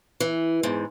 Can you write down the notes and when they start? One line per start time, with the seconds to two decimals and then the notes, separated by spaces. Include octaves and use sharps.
0.20 E3
0.63 E2 G#2